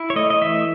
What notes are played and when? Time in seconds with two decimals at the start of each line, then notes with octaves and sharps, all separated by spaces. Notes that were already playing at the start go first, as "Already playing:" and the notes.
Already playing: E4
0.10 C#5
0.16 A3 D#5
0.30 D#5
0.42 E3 E5